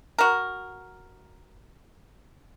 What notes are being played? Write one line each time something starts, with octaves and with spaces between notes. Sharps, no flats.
F#4 A#4